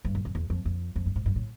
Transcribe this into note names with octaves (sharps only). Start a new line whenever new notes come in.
G2
F#2
F2
E2
F2
F2
F2
G2
G#2
G2
A2